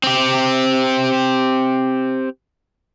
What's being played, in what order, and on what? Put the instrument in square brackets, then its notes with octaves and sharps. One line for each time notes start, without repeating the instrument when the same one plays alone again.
[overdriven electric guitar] C4 G4